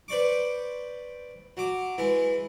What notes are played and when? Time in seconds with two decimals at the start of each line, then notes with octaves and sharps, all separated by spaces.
0.08 B4 C5 D5 C#6 D6
1.57 F#3 D6
1.98 E3 G#3 E4